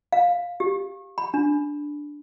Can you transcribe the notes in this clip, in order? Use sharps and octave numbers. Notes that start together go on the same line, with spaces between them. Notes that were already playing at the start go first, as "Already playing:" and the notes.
F5
G4
B5
D4